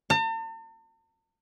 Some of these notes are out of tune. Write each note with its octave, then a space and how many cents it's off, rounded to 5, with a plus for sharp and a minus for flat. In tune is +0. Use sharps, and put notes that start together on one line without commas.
A5 +45